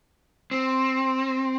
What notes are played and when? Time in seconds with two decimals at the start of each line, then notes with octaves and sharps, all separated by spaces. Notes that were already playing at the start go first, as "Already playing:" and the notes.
0.51 C4